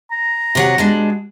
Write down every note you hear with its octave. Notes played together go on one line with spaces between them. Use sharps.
A#5
C3 F#3 F#5
B2 G#3 D4